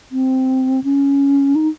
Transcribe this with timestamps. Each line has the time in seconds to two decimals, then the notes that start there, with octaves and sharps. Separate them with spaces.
0.12 C4
0.84 C#4
1.55 D#4